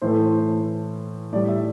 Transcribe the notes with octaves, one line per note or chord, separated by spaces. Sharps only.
A2 E3 A3 C5
A2 G3 D5
E5